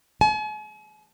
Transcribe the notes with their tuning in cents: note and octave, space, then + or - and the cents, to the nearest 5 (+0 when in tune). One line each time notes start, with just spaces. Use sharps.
G#5 +45